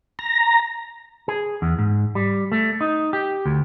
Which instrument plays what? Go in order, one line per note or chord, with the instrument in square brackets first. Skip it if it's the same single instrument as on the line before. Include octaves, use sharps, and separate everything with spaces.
[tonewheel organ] A#5
[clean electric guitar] G#4
E2
G#2
G3
A3
D#4
G4
D2